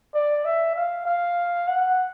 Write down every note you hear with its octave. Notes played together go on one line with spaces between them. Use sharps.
D5
E5
F5
F5
F#5